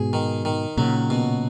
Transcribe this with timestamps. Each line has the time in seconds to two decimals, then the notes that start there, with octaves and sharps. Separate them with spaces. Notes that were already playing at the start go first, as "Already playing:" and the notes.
Already playing: G#2 B2 G#4
0.13 D#3
0.45 D#3
0.77 A#2 C#3 F#3
1.10 B2